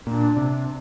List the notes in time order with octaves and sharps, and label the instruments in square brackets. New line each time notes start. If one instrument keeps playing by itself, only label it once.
[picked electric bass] A#2 [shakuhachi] D4
[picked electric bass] C3